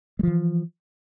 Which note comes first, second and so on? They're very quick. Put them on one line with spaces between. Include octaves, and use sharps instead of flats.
G#3 F3 E3